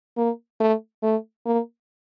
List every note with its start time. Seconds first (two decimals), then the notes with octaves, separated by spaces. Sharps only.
0.17 A#3
0.60 A3
1.03 A3
1.46 A#3